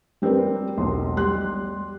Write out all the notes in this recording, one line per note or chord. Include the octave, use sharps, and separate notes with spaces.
G3 C4 D4 A#4 B4
E1 B1 C6
G3 C6 F#6